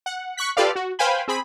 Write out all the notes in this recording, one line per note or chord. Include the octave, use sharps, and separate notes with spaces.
F#5
C#6 F#6 B6
F4 G4 A4 B4 D5 F5
F#4
B4 C5 F5 G5 G#5 B5
C4 G#4 B5